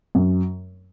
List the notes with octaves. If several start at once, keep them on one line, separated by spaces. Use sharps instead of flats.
F#2